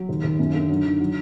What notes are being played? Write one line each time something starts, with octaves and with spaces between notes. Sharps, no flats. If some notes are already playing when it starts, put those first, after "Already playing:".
Already playing: F#3
D#2
D#2
F#2
D3
F#3
D#3
F#3